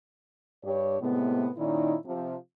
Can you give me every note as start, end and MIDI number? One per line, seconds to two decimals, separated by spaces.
0.64 0.97 43
0.64 0.97 67
0.64 0.97 73
1.01 1.48 45
1.01 1.48 48
1.01 1.48 56
1.01 1.48 59
1.58 1.96 46
1.58 1.96 51
1.58 1.96 61
1.58 1.96 63
1.58 1.96 64
1.58 1.96 74
2.06 2.36 48
2.06 2.36 53